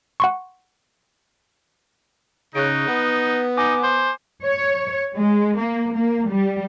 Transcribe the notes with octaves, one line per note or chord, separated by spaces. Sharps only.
F#5 C6 C#6
C#3 D#4 F#6 D7
B3
D#4 G#5 D6
C5
C#5
G#3
A#3
A#3
G3